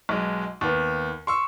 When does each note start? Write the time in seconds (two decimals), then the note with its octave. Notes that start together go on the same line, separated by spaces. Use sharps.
0.09 B1 G#3
0.61 D#2 B3
1.27 C6 C#6 E6